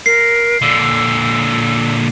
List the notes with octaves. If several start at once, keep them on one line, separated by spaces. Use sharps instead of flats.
A#4 C7
A#2 D3 E6